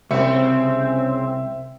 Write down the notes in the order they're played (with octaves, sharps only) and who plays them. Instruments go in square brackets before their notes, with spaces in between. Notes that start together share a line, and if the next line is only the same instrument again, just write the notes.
[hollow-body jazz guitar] C2 [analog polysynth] C#3 C4 [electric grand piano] E5 C#7